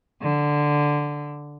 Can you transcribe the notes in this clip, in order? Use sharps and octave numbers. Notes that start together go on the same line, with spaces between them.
D3